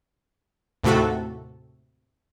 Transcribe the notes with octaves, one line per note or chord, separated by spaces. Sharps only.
D#2 A2 C3 A3 F#4 A4